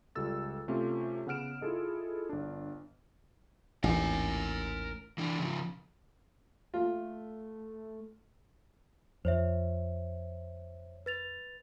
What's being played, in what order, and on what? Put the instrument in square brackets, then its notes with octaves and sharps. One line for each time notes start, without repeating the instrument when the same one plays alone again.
[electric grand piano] C#2 G3 F4 A4 E6 A6
C3 A3 C#4 F4 G4
C#3 B3 F#5 F6 D7 E7
E4 F4 G#4 A4 D#5
G1 D4
[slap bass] A1 D#2 [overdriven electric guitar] A#4 G#5
[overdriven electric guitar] E3 D4
C#3 F3
[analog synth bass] A3 [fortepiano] F4
[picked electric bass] F2 [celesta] C5 C#5 E5
[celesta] B4 A6 F7